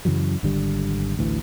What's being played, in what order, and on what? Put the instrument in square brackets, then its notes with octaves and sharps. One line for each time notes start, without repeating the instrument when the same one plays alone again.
[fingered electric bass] F#2 C#3 E3 F#3
G#1 D3 G3
A1 D2 E3